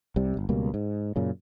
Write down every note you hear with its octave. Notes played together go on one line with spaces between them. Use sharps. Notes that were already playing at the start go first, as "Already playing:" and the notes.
C2 C3 G3
G1
C#2 B2 G3 A#3
G#2
F#2 A#2 C#3